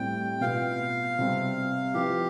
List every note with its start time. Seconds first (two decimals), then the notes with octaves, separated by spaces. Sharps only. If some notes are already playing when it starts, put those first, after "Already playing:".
Already playing: A2 G3 C4 E4 G5
0.41 B2 B3 F4 F5
1.19 C3 G3 C4
1.94 F3 B3 E4 G4